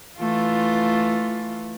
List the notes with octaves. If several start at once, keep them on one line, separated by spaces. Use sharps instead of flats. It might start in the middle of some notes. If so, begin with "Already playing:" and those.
E3 A3 F4